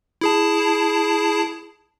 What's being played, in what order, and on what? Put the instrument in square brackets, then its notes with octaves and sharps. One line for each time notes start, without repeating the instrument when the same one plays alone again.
[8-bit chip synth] E4 G#4 A5